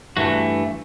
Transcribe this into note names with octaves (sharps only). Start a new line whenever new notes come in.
G2 E3 A3 F#4